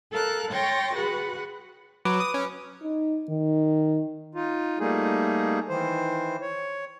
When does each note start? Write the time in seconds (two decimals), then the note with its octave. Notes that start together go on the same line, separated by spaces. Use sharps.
0.12 A4 A#4 F5 F#6
0.51 C#5 G5 C6 C#6 A6 A#6
0.93 F#4 G#4 B4 F#5
2.05 F#3 B4 D6
2.20 D#6
2.34 C#4
2.82 D#4
3.29 D#3
4.35 D#4 F4
4.80 G3 A3 A#3 D#4 G#4
5.69 D#3 E3 C5
6.42 C#5